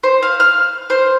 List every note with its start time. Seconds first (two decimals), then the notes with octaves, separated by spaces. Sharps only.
0.03 C5
0.23 F5
0.40 F6
0.90 C5